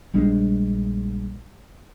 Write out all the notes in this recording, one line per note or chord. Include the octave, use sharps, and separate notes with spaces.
A#1 G3 G#3 D4